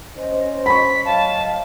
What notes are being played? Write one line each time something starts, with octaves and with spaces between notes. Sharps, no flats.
C#4 C5 D#5
B5 C#6 B6
F#3 C#5 D#5 F5 A5